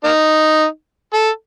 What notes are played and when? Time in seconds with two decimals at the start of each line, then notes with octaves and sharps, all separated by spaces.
0.04 A#3 D#4
1.14 A4